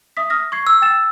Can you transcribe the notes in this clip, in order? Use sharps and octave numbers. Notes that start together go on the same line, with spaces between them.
E5 D#6 B6
D#6 F6 A#6
C#6 G#6 C7
E6
G5 A6 E7